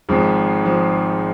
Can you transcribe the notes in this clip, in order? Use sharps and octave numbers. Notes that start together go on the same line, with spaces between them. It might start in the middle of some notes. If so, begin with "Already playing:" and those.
G#1 G#2 F3
F3